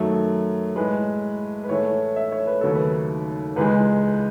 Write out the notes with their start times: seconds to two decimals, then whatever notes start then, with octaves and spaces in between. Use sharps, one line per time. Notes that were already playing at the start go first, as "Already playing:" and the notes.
Already playing: F#2 D#3 F#3 A3
0.76 A2 G#3 B4
1.64 B4
1.69 A2 E3 A3 C#5
2.16 E5
2.32 C#5
2.47 B4
2.61 D#2 C#3 F#3 A3 A4
2.75 B4
3.56 C#2 C#3 E3 G#3 B4